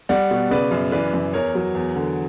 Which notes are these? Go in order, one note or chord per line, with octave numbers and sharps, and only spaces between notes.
G3 D5 F#5
B2
C#3 B4 D5
F#2
E3 B4 D5
F#2
E2 A#4 C#5
F#3
E2
D3